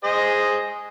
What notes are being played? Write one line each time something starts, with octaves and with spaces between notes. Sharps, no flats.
G#4 C5 D#5